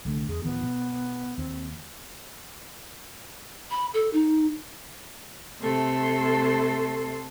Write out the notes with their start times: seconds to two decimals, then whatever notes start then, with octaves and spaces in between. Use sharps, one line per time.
0.05 C2 D3 A3
0.28 E2 G#4
0.43 D1 D#3 F3 B3
0.63 B2
1.38 D#2 C4
3.71 B5
3.94 A4
4.13 D#4
5.61 C3 A3 A4 C6